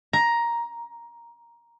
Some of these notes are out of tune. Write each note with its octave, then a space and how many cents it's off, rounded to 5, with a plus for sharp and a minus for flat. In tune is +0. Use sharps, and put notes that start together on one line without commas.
A#5 +10